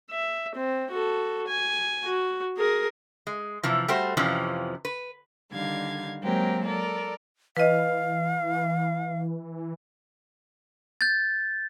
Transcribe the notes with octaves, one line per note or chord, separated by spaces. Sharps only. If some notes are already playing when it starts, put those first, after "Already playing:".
E5
C4
F#4 A4
G#5
F#4
G#4 A#4
G#3
C3 E3 F3
G3 A3 F#4 C5
F2 C3 E3 F3 C#4
B4
D3 D#3 G3 F5 G#6
F#3 G#3 A#3 C4 G4 A#4
A4 A#4 D5
E3 B4 D#5 F5
G6 A6